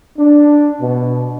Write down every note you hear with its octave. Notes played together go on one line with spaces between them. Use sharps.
D4
B2